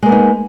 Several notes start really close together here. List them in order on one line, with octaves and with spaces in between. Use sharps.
G#3 A#3 B3 D#4